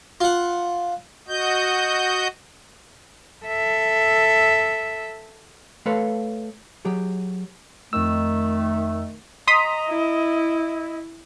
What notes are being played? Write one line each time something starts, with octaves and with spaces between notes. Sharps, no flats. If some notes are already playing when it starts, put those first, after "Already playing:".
F4 F#5
F#4 D#5 G6
A4 E5
A3 A4 B4 C#5 F5 C6
F#3 G4 G#4
F2 D#3 A3 E6
D#5 A#5 C6 D#6 B6
E4